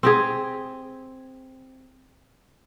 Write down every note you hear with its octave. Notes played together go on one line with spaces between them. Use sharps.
C4 G4 G#4